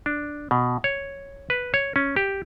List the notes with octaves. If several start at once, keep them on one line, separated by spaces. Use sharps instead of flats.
D4
B2
C#5
B4
C#5
C#4
G4